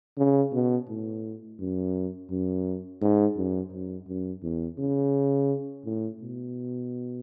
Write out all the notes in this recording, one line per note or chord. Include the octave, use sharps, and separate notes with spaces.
C#3
B2
A2
F#2
F#2
G#2
F#2
F#2
F#2
E2
C#3
A2
B2